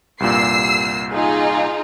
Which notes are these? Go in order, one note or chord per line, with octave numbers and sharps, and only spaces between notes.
C2 G2 A#2 E6 C7
D#4 F4 G#4